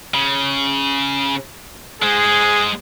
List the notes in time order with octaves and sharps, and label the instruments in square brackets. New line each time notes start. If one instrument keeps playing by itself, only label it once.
[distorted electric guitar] C#3
[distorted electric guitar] G#3 C5 [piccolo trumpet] G#4